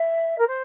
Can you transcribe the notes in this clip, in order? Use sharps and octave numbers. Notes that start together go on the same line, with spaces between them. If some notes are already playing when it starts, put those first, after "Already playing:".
Already playing: E5
A#4
C5